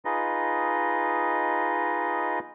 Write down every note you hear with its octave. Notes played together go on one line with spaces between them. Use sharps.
D#4 F4 G#4 B4 D#5